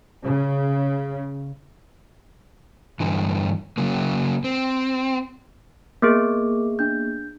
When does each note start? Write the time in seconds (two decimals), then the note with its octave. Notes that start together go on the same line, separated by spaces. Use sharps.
0.23 C#3
3.00 G2 D3 E3
3.78 C#3 F#3 A#3
4.44 C4
6.02 A#3 B3 G#4 A#4 D6
6.79 D4 G6